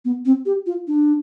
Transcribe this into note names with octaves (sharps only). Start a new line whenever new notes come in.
B3
C4
G4
F4
D4